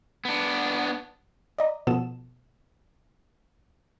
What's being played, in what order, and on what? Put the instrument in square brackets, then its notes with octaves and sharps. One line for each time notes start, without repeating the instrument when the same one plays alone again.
[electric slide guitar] B3 D4
[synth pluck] D5 D#5 A#5
B2 F3 B3 A4 D#6 E7